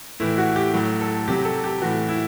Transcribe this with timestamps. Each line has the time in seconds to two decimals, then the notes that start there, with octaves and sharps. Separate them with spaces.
0.20 A2 E3 E4
0.38 F#4
0.56 G4
0.74 A2 F#3
1.01 A4
1.28 C3 F#3 G4
1.45 A4
1.64 G4
1.81 A2 E3 F#4
2.08 E4